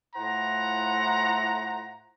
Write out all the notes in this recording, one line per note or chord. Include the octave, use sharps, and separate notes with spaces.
A2 E4 F4 C5 F#5 A#5